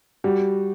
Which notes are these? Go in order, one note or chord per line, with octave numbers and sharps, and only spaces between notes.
G3 F#4